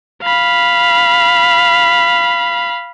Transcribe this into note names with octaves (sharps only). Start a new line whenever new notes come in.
F5 B5